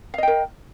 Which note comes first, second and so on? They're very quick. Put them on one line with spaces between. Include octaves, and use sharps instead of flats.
F5 D#5 G5 A#4